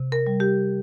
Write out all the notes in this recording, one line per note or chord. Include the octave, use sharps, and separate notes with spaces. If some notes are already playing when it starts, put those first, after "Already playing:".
Already playing: C3
A#4
G3
G4